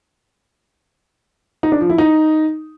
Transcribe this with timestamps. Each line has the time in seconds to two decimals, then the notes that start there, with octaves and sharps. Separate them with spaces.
1.63 D#4
1.72 D4
1.81 F3
1.90 E4
1.98 D#4